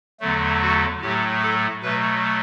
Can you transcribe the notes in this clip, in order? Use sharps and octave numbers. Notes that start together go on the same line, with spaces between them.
E2 D3 F#3 A3
F#4
A2 F#3 A3 G4
A4
B2 F#3 A3 B4